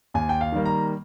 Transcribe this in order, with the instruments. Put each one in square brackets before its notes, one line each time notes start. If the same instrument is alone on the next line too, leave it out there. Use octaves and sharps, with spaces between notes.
[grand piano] D#2 G#5
G5
F5
D#3 G3 A#3
A#5